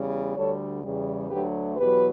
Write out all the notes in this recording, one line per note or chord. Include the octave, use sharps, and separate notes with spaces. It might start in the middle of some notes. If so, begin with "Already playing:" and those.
Already playing: E2 C#3 G3
D2 D3 G3 A4 C#5
E2 C#3 G3
D2 D3 F#3 A3 G4 B4
E2 B2 F#3 G4 B4